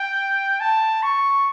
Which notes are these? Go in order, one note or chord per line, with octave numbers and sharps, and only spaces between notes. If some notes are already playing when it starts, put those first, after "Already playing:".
Already playing: G5
A5
C#6